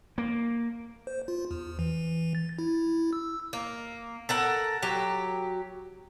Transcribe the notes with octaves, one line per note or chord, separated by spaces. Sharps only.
A#3
C5
F4
E2
E3
A6
E4
E6
A#3
A4 A#4 F#5
F#3 G4